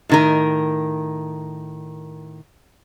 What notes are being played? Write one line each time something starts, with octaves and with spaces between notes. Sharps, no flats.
A2 D#3 A#4